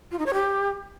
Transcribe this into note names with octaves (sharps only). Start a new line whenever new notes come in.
F4
D#4
C#5
G4